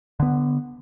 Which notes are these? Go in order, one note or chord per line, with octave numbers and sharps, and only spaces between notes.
D3 B3